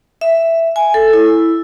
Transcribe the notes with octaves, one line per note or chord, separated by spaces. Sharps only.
E5
G#5
A4
E4